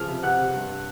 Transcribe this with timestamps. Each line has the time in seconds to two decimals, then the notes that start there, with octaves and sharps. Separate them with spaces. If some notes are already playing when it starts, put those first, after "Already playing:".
Already playing: C#3 F3 F6
0.08 C3
0.23 C3 F#5 F#6
0.39 C3
0.54 G2